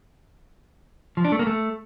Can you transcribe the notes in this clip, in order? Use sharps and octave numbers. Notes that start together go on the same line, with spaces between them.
F3
D4
A3
A#3
A3